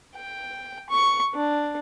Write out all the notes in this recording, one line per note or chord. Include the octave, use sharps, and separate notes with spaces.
G5
C#6
D4